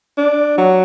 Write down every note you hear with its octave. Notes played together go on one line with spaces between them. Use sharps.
D4
F#3